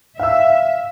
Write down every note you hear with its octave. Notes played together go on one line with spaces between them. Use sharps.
E5 F5 E6